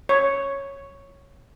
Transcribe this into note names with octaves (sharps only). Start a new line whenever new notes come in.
C#5